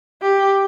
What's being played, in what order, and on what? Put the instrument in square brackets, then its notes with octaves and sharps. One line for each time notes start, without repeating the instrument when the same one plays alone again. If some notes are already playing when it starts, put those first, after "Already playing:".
[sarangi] G4